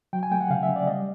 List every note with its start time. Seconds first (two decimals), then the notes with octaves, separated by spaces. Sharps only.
0.13 F#3 G5
0.23 G#5
0.31 A3 G5
0.41 F#5
0.50 C#3 F5
0.63 E5
0.69 C#3
0.76 D5
0.88 G3 D#5